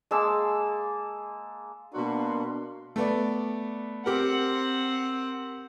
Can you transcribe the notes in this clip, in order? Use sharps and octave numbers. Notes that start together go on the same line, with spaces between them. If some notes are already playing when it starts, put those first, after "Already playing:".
G#3 A#3 A5 E6
B2 A#3 D4 F#4 A#4 C6
A3 B3 D5
C4 G4 A#4 F#5